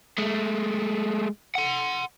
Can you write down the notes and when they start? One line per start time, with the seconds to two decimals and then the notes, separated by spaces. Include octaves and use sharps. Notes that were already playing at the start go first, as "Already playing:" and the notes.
0.18 G#3 A3
1.55 F#5 C6